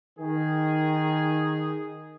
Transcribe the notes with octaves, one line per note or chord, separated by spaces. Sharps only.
D#3 G#4